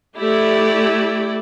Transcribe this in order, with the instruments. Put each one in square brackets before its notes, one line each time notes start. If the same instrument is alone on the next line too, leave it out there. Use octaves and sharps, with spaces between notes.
[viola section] A3 E4 G4 D5